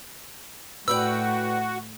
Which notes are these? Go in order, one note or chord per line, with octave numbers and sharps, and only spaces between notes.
A2 F#4 B4 D5 G5 E6